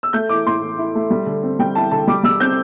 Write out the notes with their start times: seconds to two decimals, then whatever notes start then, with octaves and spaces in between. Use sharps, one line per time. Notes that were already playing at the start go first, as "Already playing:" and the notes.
0.03 E6
0.13 A3 G6
0.29 E3 D6
0.46 A2 C6
0.62 E3
0.78 E4
0.95 A3
1.10 G3
1.26 D3
1.43 C4
1.59 G3 G5
1.75 E4 A5
1.91 D3 A5
2.07 G3 D6
2.24 G3 E6
2.40 C4 G6